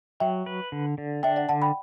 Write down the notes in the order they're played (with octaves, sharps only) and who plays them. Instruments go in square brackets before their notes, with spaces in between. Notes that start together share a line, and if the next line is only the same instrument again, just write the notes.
[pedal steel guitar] F#3 [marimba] E5 G5
[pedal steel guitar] B4
D3
D3
[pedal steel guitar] D4 [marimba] E5 G5
[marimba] D5 F#5
[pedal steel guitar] D3 [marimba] F#5 A5
[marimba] G5 B5